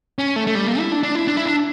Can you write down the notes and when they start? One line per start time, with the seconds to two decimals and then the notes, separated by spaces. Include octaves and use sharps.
0.19 C#4
0.36 A3
0.47 A3
0.55 G3
0.67 A#3
0.79 E4
0.91 D4
1.03 D4
1.15 E4
1.28 D4
1.37 E4
1.46 D4